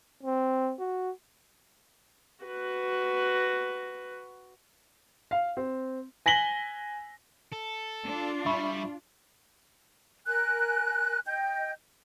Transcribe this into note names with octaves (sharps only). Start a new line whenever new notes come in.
C4
F#4
F#4 B4
F5
C4
G#5 A#6 B6 F#7 G7
A4
D4 F4
G3 E5 B5 C#6
A#4 G#5 F#6
D#5 G5 G6